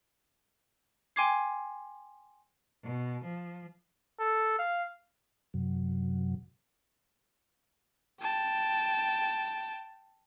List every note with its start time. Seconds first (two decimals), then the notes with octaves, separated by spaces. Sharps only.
1.16 G5 G#5 C6 D6 G#6 C7
2.85 B2
3.24 F3
4.19 A4
4.59 F5
5.54 F#2 C3 F#3
8.20 G5 A5